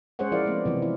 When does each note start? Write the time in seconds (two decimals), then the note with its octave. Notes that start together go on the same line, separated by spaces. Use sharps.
0.19 G#3 C#4 G#4 C5 C#5 F#5
0.32 F3 E4 A#4 D5 F5
0.46 G#3 A3 B3 C4
0.66 C3 E3 F3
0.82 E4